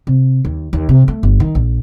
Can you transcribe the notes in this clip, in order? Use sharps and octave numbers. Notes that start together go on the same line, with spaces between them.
C3
D#2
D#2
C3
A3
G1
D#3
A#1